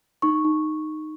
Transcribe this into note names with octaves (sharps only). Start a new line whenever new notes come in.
D#4 C#6
D#4